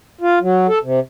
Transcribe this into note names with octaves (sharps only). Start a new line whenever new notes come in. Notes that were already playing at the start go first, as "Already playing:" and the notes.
F4
F#3
A4
C3